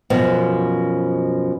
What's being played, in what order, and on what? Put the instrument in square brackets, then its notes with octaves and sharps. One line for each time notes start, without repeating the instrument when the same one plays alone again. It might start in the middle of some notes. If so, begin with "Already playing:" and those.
[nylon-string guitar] F#2 B2 F3